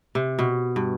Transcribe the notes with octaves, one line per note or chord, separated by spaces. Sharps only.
C3
B2
G2